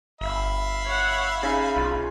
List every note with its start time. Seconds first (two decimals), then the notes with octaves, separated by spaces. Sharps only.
0.21 G1 E5 F5 B5
0.86 C#5 F#5
1.43 C#3 D#4
1.76 B1 F4